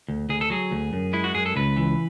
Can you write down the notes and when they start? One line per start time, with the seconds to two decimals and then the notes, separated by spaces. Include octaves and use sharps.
0.08 D2
0.29 D2 G#4
0.41 A4
0.50 F#3 G#4
0.71 D2
0.93 F#2
1.13 G#3 E4
1.24 F#4
1.35 F#2 G#4
1.46 A4
1.56 C#2 B4
1.77 E3